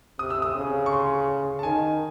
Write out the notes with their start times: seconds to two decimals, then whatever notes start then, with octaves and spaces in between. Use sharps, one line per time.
0.19 C3 D#6
0.30 E6
0.42 D#6
0.55 C#3
0.86 C#6
0.92 C6
1.59 A5
1.63 D#3 G#5